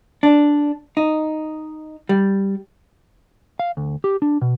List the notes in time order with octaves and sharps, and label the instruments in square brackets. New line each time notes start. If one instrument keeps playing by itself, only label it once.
[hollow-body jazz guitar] D4
D#4
G3
[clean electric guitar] F5
D2
G4
D4
B2